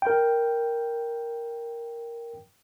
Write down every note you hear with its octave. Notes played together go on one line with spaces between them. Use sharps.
A#4 G5